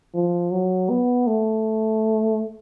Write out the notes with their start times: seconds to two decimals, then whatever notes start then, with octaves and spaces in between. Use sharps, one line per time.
0.14 F3
0.52 F#3
0.90 B3
1.27 A3